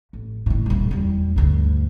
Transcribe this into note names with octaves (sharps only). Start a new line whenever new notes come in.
A1
A2 D#3
D#1 G3
E2 G3
D2 G2